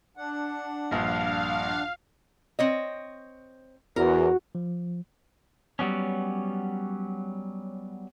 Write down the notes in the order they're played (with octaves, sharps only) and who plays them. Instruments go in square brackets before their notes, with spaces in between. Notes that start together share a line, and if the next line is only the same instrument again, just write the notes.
[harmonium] D4 F#5
[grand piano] A#1 G2 [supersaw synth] F5
[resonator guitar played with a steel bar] C4 C#5 D#5
[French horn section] E2 [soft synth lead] F#4 [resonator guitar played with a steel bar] A#4
[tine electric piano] F3
[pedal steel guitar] F#3 G3 B3 C#4